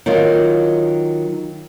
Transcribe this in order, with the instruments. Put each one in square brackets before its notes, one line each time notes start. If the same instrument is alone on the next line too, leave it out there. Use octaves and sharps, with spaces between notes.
[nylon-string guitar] D#3 F#3 D#4 F4